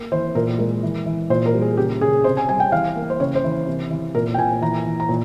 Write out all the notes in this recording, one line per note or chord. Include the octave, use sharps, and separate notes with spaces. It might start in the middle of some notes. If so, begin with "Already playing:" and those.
Already playing: A#3
E3 C5
A#2 A#4
G#3 A#4
E3
E3
A#2 C5
A#4
G3
G#4
C#3 G4
C#3 G#4
C3 C5
G#5
G3 G#5
G5
E3 F5
A#3
C5
C#3 C#5
C5
E3
C3
E3
A#2 A#4
G5
A#2 G#5
E3 A#5
E3
A#5
A#2